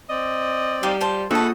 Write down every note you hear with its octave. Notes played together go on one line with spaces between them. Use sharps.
C4 D5 D#5
G3 D#4 G4 F5
F4 C5 A5
A#3 D4 F4 A4 B4 F#5 A5 D#6